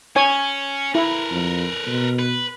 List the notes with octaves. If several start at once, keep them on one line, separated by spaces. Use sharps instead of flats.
C#4 C#5 G#5
E4 A#4 B4
F2
B2
B4